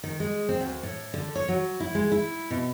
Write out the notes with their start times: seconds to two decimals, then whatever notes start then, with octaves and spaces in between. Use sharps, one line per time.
0.03 D#3
0.20 G#3
0.49 C4
0.61 D2
0.83 A2
1.14 D3
1.35 C#5
1.48 F#3
1.80 E4
1.95 G#3
2.12 E4
2.50 B2